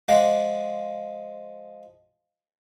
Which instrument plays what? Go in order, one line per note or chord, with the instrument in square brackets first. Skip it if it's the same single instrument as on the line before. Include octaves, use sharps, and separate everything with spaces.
[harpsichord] F3 G#3 F4 D5 D#5 F#5